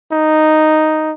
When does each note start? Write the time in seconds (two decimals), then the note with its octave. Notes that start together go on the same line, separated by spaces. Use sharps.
0.12 D#4